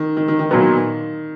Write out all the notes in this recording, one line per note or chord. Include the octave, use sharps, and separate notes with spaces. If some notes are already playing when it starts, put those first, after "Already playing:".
Already playing: D#3
D#3
D#3
D#3
A#2 D#3 F#3 B3